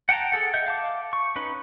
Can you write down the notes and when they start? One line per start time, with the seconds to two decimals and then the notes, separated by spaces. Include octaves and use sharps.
0.09 F#5 G5 A5 A#5
0.32 G#4 A4 F#5
0.54 D#5 E5 F#5 G6
0.66 F5 A5 D6
1.13 C#6
1.36 C#4 D#4 B4 B5